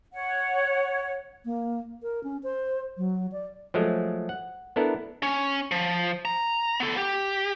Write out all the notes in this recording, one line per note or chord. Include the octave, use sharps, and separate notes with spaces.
C#5 F#5
A#3
A#4
C#4
C5
F#3
D5
F3 F#3 G#3 A3
F#5
B3 D4 E4 A4 A#4
C#4
F3
A#5
B3 A4
G4